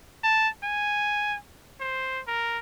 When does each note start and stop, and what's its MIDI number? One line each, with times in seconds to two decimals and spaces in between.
0.24 0.49 81
0.63 1.37 80
1.80 2.20 72
2.27 2.59 70